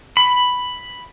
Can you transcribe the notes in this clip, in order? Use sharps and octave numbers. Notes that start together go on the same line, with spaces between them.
B5